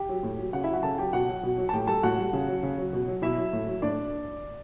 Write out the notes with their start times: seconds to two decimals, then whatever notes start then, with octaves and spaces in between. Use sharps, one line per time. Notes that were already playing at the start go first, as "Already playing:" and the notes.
Already playing: G4 G5
0.09 F#3
0.23 A2
0.39 F#3
0.53 C#3 F#4 F#5
0.64 F#3 E4 E5
0.73 F#4 F#5
0.83 C#3 A4 A5
0.98 F#3 G4 G5
1.13 B2 F#4 F#5
1.28 F#3
1.43 B2
1.58 F#3
1.69 A5
1.73 A2 G4 G5
1.87 G3 A4 A5
2.03 A2 F#4 F#5
2.18 G3
2.33 C#3
2.48 F#3
2.63 C#3
2.78 F#3
2.93 B2
3.08 F#3
3.22 B2 E4 E5
3.38 F#3
3.53 A2
3.67 F#3
3.82 A2 D4 D5